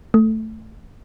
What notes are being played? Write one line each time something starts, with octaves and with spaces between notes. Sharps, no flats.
A3